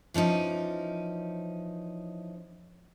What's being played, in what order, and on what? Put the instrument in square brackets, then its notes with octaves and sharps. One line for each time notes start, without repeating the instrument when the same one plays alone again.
[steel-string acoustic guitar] E3 F3 C#4 D#4